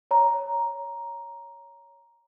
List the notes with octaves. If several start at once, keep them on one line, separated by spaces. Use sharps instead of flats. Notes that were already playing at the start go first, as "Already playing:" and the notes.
C#5 A#5